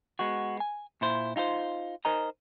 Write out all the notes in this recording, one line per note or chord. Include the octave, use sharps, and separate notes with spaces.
G#3 B3 F#4
G#5
A#2 E4 C5
D#4 F4 G#4 C5
D#4 A#4 C5 D#5 G#5 A#5